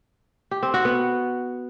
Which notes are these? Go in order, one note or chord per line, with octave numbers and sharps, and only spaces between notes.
G4
C4
F#4
B3